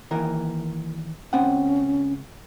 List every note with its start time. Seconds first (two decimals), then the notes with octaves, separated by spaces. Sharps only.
0.11 D#2 E3 A#4
1.33 C#2 C4 C#4 F#5